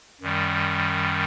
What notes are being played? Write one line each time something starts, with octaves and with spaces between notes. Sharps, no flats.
F#2 D#3 G3